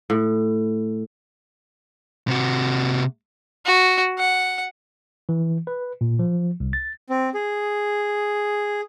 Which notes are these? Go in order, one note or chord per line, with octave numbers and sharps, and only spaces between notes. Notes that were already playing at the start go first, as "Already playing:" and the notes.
A2
C3 F#4
F#4
F#5
E3
B4
A#2
F3
C2
A6
C4
G#4